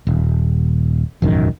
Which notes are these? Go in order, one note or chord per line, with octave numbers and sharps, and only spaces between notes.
D#1
E1 A1 F#2 D#3